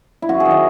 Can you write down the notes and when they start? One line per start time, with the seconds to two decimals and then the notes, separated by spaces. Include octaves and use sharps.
0.22 E4
0.29 F#2 F#4
0.40 G#4
0.45 D#3
0.51 D#5